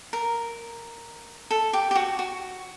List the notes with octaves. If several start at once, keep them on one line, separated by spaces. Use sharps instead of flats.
A#4
A4
G4
G4
F#4
F#4